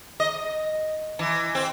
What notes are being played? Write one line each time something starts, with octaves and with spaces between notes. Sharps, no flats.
D#5
E3
C4